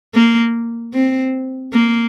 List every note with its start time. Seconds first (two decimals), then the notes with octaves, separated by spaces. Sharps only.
0.14 A#3
0.94 C4
1.73 A#3